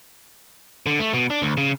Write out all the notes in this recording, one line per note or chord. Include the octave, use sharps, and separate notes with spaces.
D3
A3
B2
D4
D2
C#3